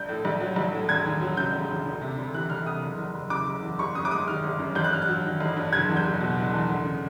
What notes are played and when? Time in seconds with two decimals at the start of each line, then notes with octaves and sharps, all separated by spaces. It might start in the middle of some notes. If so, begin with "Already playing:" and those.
Already playing: A#1 G6
0.09 A2
0.25 A#1
0.41 F#3
0.56 A#1
0.73 A2
0.89 E1 G#6
1.06 D#2
1.21 F#3
1.37 C#3 G6
1.53 E1
1.69 D#2
1.86 D2
2.01 C3
2.18 D2
2.34 E3 F#6
2.50 D2 F6
2.66 C3 D#6
2.83 F#1
2.99 E2
3.14 F#1
3.30 C#3 D6
3.47 F#1
3.63 E2
3.79 G1 C#6
3.95 F#2 D#6
4.05 D6
4.11 G#3 D#6
4.28 D#3 F6
4.44 G1
4.59 F#2
4.75 A1 G6
4.84 F#6
4.92 G2 F6
5.02 F#6
5.08 F#3
5.24 D#3
5.40 A1
5.57 G2
5.73 F#1 G#6
5.89 E2
5.97 G6
6.05 F#1
6.20 B2
6.37 F#1
6.53 E2
6.70 D2
6.86 C#3